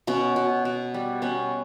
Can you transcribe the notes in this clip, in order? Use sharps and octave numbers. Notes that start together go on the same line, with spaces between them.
B2 B3 C#4
B2
B2
G3
B2 B3 C#4